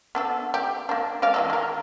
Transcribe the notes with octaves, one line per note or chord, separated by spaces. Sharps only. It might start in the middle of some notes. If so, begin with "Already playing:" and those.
B3 D4 A4
G4
A#3 D4
G#3 D5 F5
E3 F#3 A4
D#3 A#4